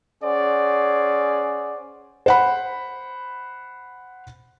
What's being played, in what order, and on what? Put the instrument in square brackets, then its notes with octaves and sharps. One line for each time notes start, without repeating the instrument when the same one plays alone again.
[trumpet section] C#4 G#4 C5 D5 F#5
[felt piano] C5 F#5 B5